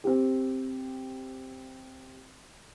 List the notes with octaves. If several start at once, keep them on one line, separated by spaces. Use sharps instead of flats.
C4 G4